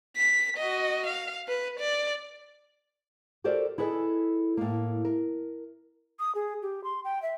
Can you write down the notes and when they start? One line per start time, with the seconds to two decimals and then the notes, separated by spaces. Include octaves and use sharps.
0.17 B6
0.57 F#4 D#5
1.06 F5
1.48 B4
1.79 D5
3.44 F#4 G4 A4 A#4 C5 D5
3.78 E4 G#4 A4 B4 D#5
4.57 A2 A#3
5.05 A#4
6.19 D#6
6.35 G#4
6.62 G4
6.84 C6
7.04 G5
7.22 E5